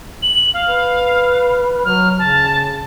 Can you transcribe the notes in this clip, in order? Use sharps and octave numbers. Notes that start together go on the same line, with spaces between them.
F#7
F5
B4
F#3 F6
C#3 A5